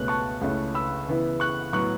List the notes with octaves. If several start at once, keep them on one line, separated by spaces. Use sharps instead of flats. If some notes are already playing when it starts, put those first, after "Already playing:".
Already playing: C#2 B2 A3 C#4 F#6
A5 C#6
C#2 C#3 A3 C#4 E4
B5 E6
C#3 E3 B3 E4
C#6 F#6
A2 F#3 B3 C#6 F#6